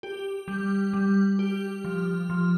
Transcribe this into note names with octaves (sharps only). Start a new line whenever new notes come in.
G4
G3
G3
G4
F3
F3